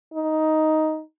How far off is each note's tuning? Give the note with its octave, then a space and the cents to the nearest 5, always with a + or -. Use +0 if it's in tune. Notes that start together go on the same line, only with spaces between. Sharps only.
D#4 +5